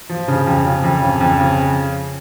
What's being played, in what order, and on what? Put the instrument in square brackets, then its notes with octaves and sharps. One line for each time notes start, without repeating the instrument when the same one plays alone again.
[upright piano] F3
C#3
F2
C#3
F2
C#3
F2
C#3